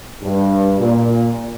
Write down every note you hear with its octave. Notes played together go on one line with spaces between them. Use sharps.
G2
A#2